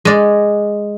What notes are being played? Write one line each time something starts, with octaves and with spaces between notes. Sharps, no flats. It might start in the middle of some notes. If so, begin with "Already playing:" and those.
G#3 D5